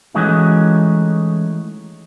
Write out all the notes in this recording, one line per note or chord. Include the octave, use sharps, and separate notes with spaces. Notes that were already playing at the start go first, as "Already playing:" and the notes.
E3 G#3 A3 C#4 D#4 F#4